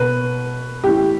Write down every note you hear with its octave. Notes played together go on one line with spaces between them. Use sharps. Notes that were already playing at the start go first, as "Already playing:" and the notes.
Already playing: B2 B4
A2 E3 G4